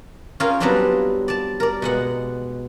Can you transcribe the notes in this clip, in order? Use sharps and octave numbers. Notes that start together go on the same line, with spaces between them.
C#4 F4 G#4 A#4 G5 C6
F#3 G3 B3 C4 D4 F4
D5 A5
A#4 D5
B2 G#3 F#5